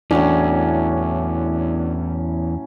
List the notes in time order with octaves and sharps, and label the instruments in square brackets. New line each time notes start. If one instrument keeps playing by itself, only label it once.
[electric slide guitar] E2 [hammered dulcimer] A2 F#3 C#4 [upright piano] D4